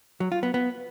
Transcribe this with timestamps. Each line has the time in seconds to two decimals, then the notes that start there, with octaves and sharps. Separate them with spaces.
0.20 F#3
0.32 F4
0.43 B3
0.54 B3